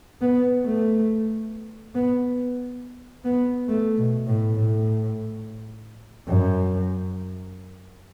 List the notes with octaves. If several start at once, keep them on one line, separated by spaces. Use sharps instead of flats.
B3
A3
B3
B3
A3
B2
A2
A2
F#2